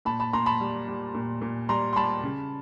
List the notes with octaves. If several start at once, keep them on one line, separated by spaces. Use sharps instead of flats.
A#2 A5 B5
A5 B5
A#2 A#5 C6
A5 B5
G3
G3
A#2
A#2
G3 A#5 C6
C6
G3 A5 B5
C#3